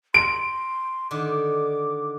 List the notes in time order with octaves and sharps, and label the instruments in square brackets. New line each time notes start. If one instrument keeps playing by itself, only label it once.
[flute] C6 [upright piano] D7
[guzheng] D3 D#3 [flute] D6